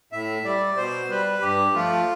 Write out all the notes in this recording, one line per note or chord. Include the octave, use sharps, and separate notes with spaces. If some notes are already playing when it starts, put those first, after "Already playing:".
A2 E5
G3 D5
B2 C5
G3 B4
G2 G4
F3 A3 F4